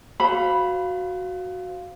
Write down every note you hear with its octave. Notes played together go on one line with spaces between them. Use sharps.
F#4 C5 F5 B5